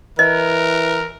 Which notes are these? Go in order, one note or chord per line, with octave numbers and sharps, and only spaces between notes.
E3 A#4 D#5